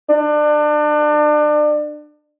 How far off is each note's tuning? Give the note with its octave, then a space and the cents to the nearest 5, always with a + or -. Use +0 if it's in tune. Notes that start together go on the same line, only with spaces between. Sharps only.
D4 +30